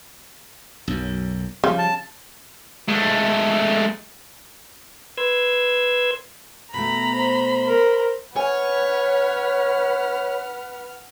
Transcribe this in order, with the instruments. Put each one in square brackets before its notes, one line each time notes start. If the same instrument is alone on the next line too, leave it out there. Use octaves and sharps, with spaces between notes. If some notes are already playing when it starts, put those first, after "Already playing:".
[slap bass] B1 F#2
[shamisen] C#3 [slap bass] F3 G3
[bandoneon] A5
[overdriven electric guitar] G#3 A3
[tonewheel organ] B4 C6 E6 G#6
[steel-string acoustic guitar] B2 A3 [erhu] A#5 [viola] B5
[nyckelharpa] C5
[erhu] A#4
[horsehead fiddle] B4 [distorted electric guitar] C#5 [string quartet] F#5 F6 [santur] G#5